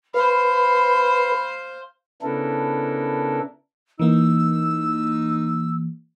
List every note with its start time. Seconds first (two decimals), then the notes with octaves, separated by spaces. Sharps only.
0.14 B4 C5 F5 B5
2.22 C#3 B3 D4 E4 A4 A#4
3.99 E3 A#3 D#4 E6